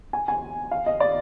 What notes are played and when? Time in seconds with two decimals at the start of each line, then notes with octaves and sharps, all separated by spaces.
0.13 G#5
0.28 G#5
0.71 F5
0.86 D#5
1.00 D5